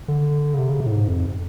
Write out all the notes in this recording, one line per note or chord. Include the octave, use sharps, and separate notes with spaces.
D3
C#3
C3
C#3
C3
A2
G#2
F2